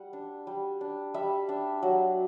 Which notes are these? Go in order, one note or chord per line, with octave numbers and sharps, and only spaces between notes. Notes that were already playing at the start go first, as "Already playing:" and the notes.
Already playing: G3 F#5
D4
G3
D4
G3 E5
D4
F#3